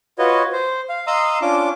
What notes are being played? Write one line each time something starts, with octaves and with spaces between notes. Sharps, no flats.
F4 F#4 B4 C#5 D#5
C5
F5
D#5 F5 A#5 C6 D#6 E6
C#4 D4 F4 D6